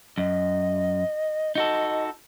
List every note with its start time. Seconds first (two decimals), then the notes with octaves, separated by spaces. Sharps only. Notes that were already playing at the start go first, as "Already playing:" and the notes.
0.18 F#2 D#5
1.55 D#4 F#4 A4 D#5